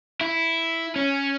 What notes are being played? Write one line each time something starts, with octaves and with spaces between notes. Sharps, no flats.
E4
C#4